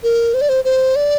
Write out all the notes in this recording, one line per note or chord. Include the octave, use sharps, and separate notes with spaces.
A#4
C5
D5
C5
C5
D5